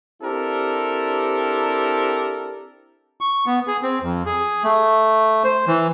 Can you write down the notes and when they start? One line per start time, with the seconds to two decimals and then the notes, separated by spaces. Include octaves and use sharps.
0.22 C4 D4 E4 G4 A4 A#4
3.21 C#6
3.46 B3
3.67 G#4
3.83 C4
4.02 F2
4.26 G#4
4.64 A3
5.44 C5
5.67 E3